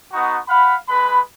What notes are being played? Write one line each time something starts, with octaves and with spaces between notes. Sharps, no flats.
B3 D#4 F#4 A#5 C#6
F5 F#5 B5
G#3 B4 B5